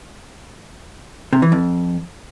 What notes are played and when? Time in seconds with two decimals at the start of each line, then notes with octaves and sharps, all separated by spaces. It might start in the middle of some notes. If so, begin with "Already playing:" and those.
1.33 C3
1.42 E3
1.52 F2